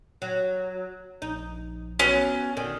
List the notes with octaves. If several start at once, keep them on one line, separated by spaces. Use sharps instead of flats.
F#3
A#1 D#4
F#3 B3 C#4
G#1 D3 D#3